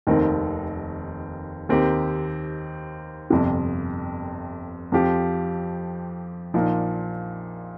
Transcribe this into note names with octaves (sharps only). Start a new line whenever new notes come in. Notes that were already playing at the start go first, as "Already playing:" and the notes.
F1 D#2 D#3 C4 D#4
D#2 D#3 C4 D#4 G4
G1 F2 C3
F2 F3 C4 G4
A#1 A#2 F3 D#4